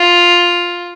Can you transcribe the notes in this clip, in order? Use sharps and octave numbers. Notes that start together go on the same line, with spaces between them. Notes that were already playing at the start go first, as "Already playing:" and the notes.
Already playing: F4